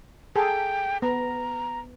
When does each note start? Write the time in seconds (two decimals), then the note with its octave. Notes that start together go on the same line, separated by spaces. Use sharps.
0.36 G#4 A4 G5
1.02 B3 A#5